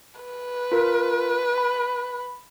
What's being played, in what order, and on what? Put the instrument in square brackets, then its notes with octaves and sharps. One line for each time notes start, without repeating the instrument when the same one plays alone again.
[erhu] B4
[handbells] F4 A#4
B5